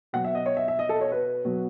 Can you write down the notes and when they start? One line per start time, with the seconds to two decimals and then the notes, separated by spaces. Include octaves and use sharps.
0.13 B2 F#3 F#5
0.24 E5
0.35 D#5
0.46 C#5
0.57 E5
0.68 E5
0.79 D#5
0.89 A4
1.01 C#5
1.12 B4
1.45 B2 F#3